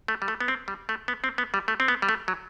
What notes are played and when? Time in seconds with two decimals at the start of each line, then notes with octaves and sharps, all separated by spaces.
0.08 A3
0.22 G3
0.28 A3
0.40 B3
0.48 C4
0.68 G3
0.89 A3
1.08 B3
1.24 C4
1.38 B3
1.54 G3
1.68 A3
1.80 C4
1.88 B3
2.02 G3
2.09 A3
2.28 F#3